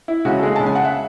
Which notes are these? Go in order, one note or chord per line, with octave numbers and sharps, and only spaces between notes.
E4
C#3 G#3 C#4 F#4
A4
G#3 G#4
C#3 G#3 C#4 A5
G#5
F#5
E5